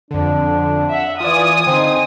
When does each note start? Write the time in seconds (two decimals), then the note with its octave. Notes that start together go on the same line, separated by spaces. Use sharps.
0.11 F2 D3 D4
0.90 E5 F#5
1.20 E3 F4 D5 G#5 D#6
1.67 D3 C4 D#4